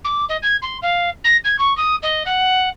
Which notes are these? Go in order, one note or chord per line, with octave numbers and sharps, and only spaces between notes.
D6
D#5
G#6
C6
F5
A#6
G#6
C#6
D#6
D#5
F#5